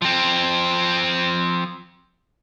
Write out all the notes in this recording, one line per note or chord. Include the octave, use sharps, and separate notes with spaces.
F3 C4